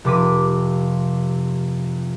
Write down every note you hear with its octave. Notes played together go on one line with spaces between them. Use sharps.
F1 C3 D6 B6 D#7